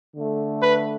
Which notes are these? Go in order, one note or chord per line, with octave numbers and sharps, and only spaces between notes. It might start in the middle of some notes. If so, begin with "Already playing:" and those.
D3 A3
B4